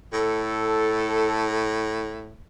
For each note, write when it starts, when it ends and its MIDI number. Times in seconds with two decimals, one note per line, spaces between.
0.13 2.40 45
0.13 1.65 69